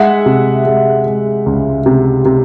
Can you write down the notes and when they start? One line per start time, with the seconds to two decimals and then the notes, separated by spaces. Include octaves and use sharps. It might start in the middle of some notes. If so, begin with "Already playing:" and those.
Already playing: G#3 E5 F#5
0.26 C3
0.66 G#3
1.06 G#3
1.46 C#2
1.86 C3
2.25 C3